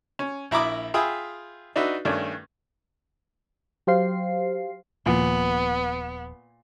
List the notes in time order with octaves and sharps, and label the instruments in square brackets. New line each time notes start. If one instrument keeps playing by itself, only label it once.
[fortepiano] C#4
A#1 E4 A#5 B5 D6 D#6
F4 G#4 E5 G5 B5 D#6
D4 D#4 F#4 B4 E5
G2 D#3 A3 C#4 D4
[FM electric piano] F#3 G4 C5 F5 C7
[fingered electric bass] D#1 F3 [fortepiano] A#2 [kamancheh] B3